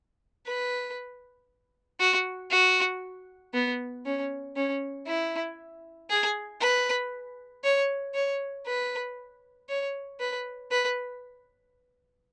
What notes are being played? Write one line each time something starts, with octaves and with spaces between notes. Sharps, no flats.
B4
F#4
F#4
B3
C#4
C#4
E4
G#4
B4
C#5
C#5
B4
C#5
B4
B4